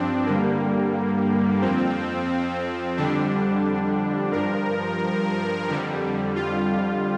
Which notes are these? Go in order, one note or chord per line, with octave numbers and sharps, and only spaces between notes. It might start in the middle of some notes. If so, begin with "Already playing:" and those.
Already playing: G2 F3 C4 D4
G2 D3 G3 A#3
F2 F3 C4
F2 D3 G3 D4
G2 F3 A#4
F2 D3 G3
F4